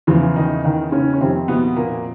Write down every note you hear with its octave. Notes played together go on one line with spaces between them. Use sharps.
E2 C#3 E3 F3 F4
D#3 D#4
D#3 D#4
C#3 C#4
C#4
F2 C3 D#3 C4
B2 B3
A#2 A#3